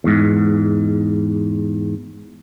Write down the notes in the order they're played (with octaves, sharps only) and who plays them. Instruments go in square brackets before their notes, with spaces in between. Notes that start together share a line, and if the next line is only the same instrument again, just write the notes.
[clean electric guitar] E2 G#2